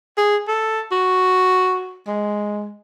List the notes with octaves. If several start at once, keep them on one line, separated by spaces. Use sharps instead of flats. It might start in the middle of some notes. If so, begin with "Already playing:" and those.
G#4
A4
F#4
G#3